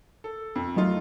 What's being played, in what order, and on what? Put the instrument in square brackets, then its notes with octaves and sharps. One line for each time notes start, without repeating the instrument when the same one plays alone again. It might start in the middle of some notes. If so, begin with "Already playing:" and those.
[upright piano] A4
F2
[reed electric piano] F#3 D#5 [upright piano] A3 D#4 F4